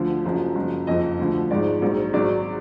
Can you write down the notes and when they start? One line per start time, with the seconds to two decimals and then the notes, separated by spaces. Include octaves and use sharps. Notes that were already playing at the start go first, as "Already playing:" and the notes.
Already playing: D2 D3 F3
0.25 F#1 F#2 F3
0.55 F#1 F#2 F3
0.87 F#1 F2 F3 D#5
1.19 D2 D3 F3
1.51 G#1 G#2 F3 D5
1.82 A#1 G#2 F#3
2.13 G#1 G#2 F#3 D5